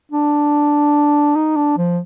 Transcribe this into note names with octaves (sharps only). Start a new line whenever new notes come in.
D4
D#4
D4
F3